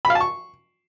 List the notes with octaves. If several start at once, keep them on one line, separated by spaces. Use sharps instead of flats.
B5
F5
A5
C#6